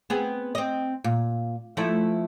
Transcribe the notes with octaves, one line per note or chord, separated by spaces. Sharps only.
B3 C4 G#4
C4 D#5
A#2
F3 A3 E4